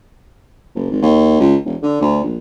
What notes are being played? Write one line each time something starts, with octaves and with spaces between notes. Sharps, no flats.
F#1
G#1
D#2
C#2
E1
D3
D2
A#1